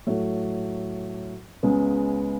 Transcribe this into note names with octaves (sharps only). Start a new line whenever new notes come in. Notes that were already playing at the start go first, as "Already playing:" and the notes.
A2 F#3 A3
C#2 C#3 G#3 B3